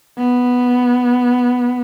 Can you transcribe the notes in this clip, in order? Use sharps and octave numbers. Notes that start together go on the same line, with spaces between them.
B3